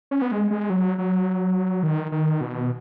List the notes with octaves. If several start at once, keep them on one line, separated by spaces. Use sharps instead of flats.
C#4
B3
G#3
G#3
F#3
F#3
D#3
D#3
B2